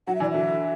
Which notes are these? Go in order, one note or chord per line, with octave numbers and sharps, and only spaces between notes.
F#3 F#5
E5
E3 D5
D3 F#3 E5